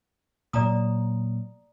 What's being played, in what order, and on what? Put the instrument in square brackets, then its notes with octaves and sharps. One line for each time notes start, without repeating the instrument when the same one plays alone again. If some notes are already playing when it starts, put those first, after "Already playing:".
[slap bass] A#2 F#3 [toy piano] D5 A#5 D#6